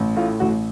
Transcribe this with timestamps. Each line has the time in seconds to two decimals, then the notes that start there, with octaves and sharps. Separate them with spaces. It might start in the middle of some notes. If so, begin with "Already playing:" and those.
Already playing: A1
0.16 A2 F4
0.40 A1 F#4